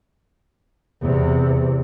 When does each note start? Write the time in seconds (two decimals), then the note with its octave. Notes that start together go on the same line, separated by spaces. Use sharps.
1.02 E2 C3